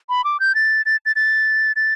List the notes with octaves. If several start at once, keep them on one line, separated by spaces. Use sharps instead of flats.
B5
D6
G6
A6
A6
A6
A6
A6